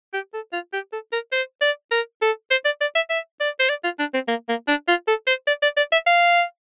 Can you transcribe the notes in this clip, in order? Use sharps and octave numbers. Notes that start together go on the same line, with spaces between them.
G4
A4
F4
G4
A4
A#4
C5
D5
A#4
A4
C5
D5
D5
E5
E5
D5
C5
D5
F4
D4
C4
A#3
A#3
D4
F4
A4
C5
D5
D5
D5
E5
F5